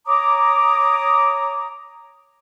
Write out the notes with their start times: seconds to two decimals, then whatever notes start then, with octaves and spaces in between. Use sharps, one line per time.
0.06 C#5 A#5 D6 D#6